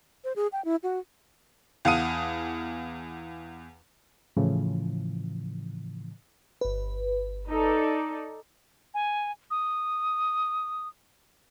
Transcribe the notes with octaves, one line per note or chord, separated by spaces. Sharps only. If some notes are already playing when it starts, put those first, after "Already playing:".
C5
G#4
G5
E4
F#4
E2 F5 F#5 A5 D#6 D#7
A2 C#3 E3 F3
G1 B4
D#4 A4 D5
G#5
D#6